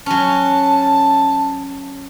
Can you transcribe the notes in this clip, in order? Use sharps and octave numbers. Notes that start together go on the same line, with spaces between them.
F#3 C#4 A5